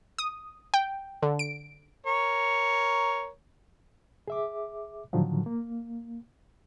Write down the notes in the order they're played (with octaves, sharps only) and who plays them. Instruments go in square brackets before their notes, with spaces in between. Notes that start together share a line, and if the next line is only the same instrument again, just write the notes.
[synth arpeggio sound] D#6
G5
D3
D7
[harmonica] A#4 C#5
[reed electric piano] G#4 E5 D6
A2 D3 D#3 F3 F#3
A#3